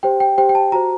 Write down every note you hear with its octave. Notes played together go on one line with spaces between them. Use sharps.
G4 C5 G5
G5
G4 C5 G5
G5
A5
F#4 C5 A#5